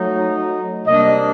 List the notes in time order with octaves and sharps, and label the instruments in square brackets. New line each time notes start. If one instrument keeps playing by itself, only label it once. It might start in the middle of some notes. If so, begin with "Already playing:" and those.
Already playing: [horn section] F#3 A3 D#4
C3 G3 A#3 D4 D#5